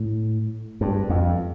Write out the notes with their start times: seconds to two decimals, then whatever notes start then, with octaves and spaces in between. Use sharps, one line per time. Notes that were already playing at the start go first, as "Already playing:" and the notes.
Already playing: A2
0.81 G2
1.09 F2